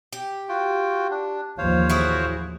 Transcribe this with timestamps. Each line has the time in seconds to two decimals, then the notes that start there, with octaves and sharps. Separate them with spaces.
0.13 G4
0.49 F4 F#4 G5
1.11 D4
1.58 A1 D#2 F3 C5 C#5 F5
1.89 E4 F#4 G#4